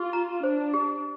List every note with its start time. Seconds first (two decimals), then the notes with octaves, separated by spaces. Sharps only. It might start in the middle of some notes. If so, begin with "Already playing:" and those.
Already playing: F4 G4
0.13 A#5
0.43 D4 C5
0.74 G4